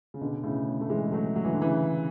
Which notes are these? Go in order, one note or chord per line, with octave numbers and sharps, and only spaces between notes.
C#3
B2 D3
A2 C#3
A3
E3 G#3
F#3 A3
F#3
E3
D3
C#3 E3